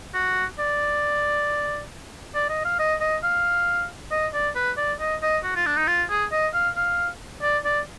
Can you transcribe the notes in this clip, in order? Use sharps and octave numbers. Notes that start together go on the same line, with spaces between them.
F#4
D5
D5
D#5
F5
D#5
D#5
F5
D#5
D5
B4
D5
D#5
D#5
F#4
F4
D4
D#4
F4
G#4
D#5
F5
F5
D5
D5